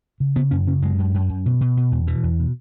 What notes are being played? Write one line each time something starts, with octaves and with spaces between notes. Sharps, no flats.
C#3
C#3 B3
F#2 C#4
C#3 C#4
F#2 G#3
F#2
F#2
F#2
B2
B2
B2
E2
B2 E3
E2
B2